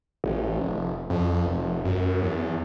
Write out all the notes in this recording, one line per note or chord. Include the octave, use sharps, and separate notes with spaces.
A1
F1
F2
F1
F#2
E2